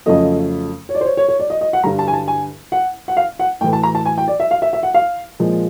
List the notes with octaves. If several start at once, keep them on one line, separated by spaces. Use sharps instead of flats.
F2 C#3 F#3 A3 D#5
C#5
D5
C5
C#5
C#5
C#5
D5
D#5
D#5
F#5
G2 D3 G3 A#5
A5
G#5
A5
G#5
F#5
F#5
F5
F#5
A2 E3 A3 G5
A5
A#5
A5
G#5
G5
D5
E5
F5
E5
E5
F#5
F5
A#2 F3 G#3